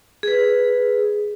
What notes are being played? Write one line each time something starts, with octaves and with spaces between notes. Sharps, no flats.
G#4 B4